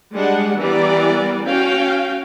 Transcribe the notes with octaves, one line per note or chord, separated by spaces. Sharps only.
G3 G#3 D4 F#5
E3 G3 B3 A#4 D5
C#4 F#4 F5 G5